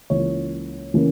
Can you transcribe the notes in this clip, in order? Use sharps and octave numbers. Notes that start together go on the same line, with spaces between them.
C#2 C#3 E3 A#3 C#4 C#5
C#3 E3 A#3 C#4